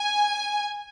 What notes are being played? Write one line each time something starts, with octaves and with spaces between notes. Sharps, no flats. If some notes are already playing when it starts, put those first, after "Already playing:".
Already playing: G#5